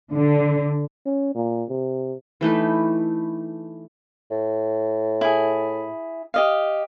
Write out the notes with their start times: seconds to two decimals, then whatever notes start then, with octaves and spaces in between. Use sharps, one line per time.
0.13 D3
1.06 C#4
1.35 A#2
1.69 C3
2.41 E3 A3 D#4 B4
4.31 A2
5.21 E4 G#4
6.34 G4 D#5 F5